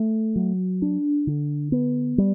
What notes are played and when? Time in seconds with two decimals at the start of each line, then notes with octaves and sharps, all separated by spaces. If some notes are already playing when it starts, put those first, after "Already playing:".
Already playing: A3
0.36 F#3
0.82 D4
1.27 D3
1.72 B3
2.18 G3